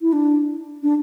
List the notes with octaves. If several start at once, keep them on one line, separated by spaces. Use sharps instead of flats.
E4
D4
D4